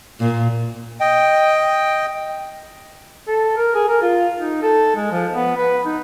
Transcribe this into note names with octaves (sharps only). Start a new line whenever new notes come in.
A#2
D#5 G5
A4
A#4
G#4
A#4
F4
D#4
A4
G#3
F3
B3
B4
D#4